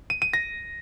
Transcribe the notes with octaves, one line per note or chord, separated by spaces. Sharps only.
D#7
D#7
A#6